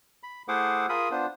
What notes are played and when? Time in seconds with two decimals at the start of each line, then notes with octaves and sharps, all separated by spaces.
0.23 B5
0.48 A3 E4 G#4 C5 F#5 D6
0.89 F4 G#4 A#4 B5 D#6
1.11 B3 D4 F4 C5